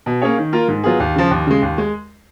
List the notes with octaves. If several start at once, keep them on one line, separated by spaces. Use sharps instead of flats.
B2
A#3 C#4 G#4 C#5
D#3
A#3 F4 A#4
G#2
F#3 B3 F4 G#4
D#2
C#3 F3
D#2
C#3 G#3
D#2
G#3